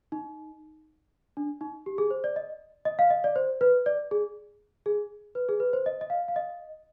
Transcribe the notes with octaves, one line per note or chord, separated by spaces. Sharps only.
D#4
D4
D#4
G4
G#4
C5
D5
D#5
D#5
F5
D#5
D5
C5
B4
D5
G#4
G#4
B4
G#4
B4
C5
D#5
D#5
F5
F5
D#5